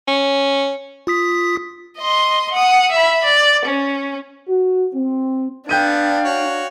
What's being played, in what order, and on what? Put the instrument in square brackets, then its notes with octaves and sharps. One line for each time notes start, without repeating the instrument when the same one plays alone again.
[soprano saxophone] C#4
[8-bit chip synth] F4 D#6 B6
[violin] D#5 C6
F#5 D#6
E5 B5
D5
C#4
[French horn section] F#4
C4
[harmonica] B3 [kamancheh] D4 [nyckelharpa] F5 [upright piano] G5 G6 D#7
[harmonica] F#4 C#5